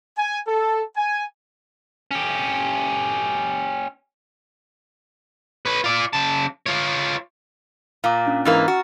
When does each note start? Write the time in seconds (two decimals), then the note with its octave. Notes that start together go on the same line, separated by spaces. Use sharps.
0.17 G#5
0.47 A4
0.97 G#5
2.11 C#4 G4
5.66 B4 C#5
5.84 F4 D5
6.13 C#3 A5
6.66 F4 C#5
8.04 A#2 F5 A#5 D6
8.27 C#4 D4
8.45 G#2 E3 A#3 A#5 F6 A6
8.68 F#4